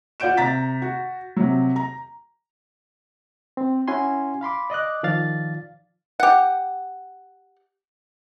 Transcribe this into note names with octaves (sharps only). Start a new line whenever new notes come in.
F4 D5 F#5 G6 D7 E7
C3 A#5 A6 B6
F#4
C3 F#3
A#5
C4
C#4 E4 F#4 G#5 C6
F5 B5 C6 D6
D5 D#5 D6 F#6
D#3 F3 D5 F5 A6
G4 F#5